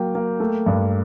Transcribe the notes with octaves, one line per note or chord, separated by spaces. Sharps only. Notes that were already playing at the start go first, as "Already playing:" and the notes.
Already playing: F#3 A#3 G5
A#3
A3
G2